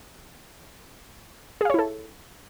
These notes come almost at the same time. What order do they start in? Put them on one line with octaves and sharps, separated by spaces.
G#4 F5 C#5 E4 A4